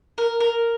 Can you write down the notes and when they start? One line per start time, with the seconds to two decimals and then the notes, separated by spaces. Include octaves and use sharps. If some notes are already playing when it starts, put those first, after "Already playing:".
0.18 A#4
0.40 A#4